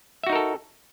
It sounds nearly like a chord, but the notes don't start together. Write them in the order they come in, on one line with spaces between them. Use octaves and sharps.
E5 F#4 D#4 A#4 A4